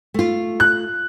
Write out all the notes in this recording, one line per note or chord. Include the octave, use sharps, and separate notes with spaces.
A3 F4
F#6